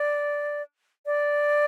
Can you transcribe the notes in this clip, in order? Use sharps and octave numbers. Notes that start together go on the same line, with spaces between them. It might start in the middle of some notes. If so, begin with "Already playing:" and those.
Already playing: D5
D5